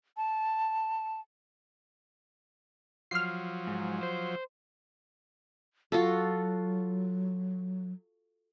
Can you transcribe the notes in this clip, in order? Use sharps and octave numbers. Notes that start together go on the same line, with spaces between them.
A5
F3 F#3 F6 C7
G#2
C5
F#3 F4 F#4 A4